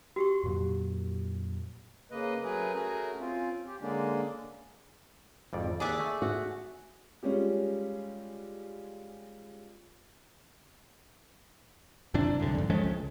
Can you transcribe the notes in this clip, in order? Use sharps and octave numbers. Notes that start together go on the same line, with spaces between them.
F#4 G4 C#6
F2 A#2 F#3
C#3 A#3 B4 D#5
F#3 A3 C#4 G#4 A#4 B4
A3 C#4 F#4 G#4 A#4
C4 C#4 F4
G4
D3 G#3 A#3 C#4 D4
G#1 F2 D5
D#2 G#4 D5 E5 F#5
A3
F#4
G3 G#3 C#4 F4 G4
F#2 C3 E3 D4
C2 F#2 D3
G#1 F2
F3 G#3 A3 C#4
C#2